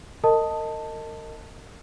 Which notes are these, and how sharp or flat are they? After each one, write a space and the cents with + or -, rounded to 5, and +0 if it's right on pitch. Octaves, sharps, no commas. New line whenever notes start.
A#4 -35 D#5 +0 A5 +10